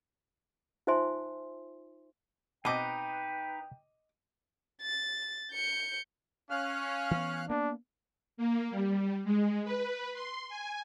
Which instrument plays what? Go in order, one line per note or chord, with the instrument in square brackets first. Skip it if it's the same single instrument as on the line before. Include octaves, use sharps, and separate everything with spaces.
[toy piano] D#4 F4 C5 E5 G#5 C6
[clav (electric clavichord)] B2 C4 [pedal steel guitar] D#4 B4 [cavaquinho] D#5 D6 [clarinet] G5
[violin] A6
G6 C#7
[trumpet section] C#4 [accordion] F5 F6 F#6
[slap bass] E3 B3
[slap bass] A#3 B3 [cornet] D4
[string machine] A#3
G3
G#3
B4
C6
G#5